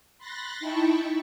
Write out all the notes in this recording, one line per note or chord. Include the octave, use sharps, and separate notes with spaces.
B5 C6 F#6 A6 A#6
D#4 E4 G5 A5 B5 C#6